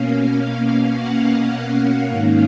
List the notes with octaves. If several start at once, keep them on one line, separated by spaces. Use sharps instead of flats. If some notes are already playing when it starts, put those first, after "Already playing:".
Already playing: B2 A#3 C#4 F5
F#5
G#2 D#3 A#3 C#4 F5